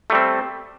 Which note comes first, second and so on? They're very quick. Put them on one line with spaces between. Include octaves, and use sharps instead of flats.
A3 G3 C4